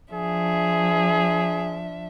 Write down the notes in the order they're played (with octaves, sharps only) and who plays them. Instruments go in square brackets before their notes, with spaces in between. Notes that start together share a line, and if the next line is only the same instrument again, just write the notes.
[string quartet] F3 D4 E5 [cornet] G#4